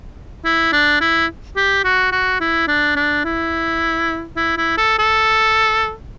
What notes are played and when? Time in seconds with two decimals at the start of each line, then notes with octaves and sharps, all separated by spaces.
0.45 E4
0.72 D4
1.01 E4
1.56 G4
1.84 F#4
2.12 F#4
2.40 E4
2.68 D4
2.96 D4
3.24 E4
4.36 E4
4.57 E4
4.77 A4
4.99 A4